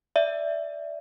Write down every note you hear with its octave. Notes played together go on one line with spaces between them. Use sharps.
D5 E5